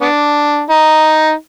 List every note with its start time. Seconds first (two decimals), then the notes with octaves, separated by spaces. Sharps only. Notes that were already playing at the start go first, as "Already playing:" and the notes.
0.01 B3 D4
0.70 D#4